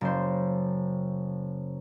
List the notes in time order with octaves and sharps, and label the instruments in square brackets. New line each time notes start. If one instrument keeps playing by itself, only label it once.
[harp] F#1 C5